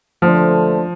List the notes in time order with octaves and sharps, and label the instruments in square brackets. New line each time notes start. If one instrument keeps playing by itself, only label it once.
[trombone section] D3 A3 D4 A4 C5 [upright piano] F3